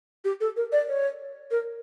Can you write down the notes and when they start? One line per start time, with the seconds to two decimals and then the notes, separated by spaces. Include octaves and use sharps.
0.24 G4
0.40 A4
0.56 A#4
0.72 D5
0.88 C#5
1.51 A#4